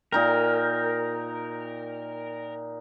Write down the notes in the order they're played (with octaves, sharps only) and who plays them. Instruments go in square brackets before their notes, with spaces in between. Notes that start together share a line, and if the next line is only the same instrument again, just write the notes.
[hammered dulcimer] A#2 D#4 G5 [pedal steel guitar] A#4